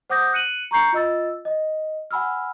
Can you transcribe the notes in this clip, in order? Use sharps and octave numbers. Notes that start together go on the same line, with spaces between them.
C5 F#5 D6 D#6 G6 A#6
F#6 C#7 D#7 F#7
A#5 C#6 G6 C7 C#7
F4 D#5 E6 A6
D#5
F#5 G#5 B5 E6 F6